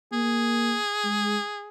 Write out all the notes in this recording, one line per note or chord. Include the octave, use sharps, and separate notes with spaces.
A#3 G#4
G#3